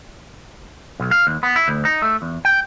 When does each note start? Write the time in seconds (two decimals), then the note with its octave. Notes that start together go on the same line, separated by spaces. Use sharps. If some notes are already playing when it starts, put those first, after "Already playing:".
1.00 B1
1.11 F5
1.27 D#2
1.43 B3
1.56 E4
1.68 D2
1.85 D#4
2.02 A3
2.22 E2
2.45 G5